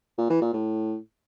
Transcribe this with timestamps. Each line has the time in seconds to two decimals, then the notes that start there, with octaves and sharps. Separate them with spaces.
0.18 A#2
0.30 E3
0.41 A#2
0.53 A2